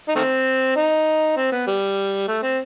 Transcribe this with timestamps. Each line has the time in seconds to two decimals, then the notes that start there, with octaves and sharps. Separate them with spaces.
0.08 D#4
0.15 D#3 A3 C4
0.76 D#4
1.36 C4
1.52 B3
1.67 G3
2.28 A3
2.43 C4